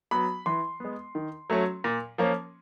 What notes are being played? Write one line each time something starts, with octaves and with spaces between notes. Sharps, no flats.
F#3 B3 B5
E3 C6
G#3 B3
D#3
F#3 A3 C#4
A#2
F3 A#3 C#4